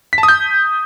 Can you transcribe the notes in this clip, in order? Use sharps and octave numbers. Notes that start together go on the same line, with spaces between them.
B6
A5
D#6
G6